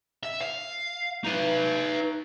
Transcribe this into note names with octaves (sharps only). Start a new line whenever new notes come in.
E5
F5
D#4 B4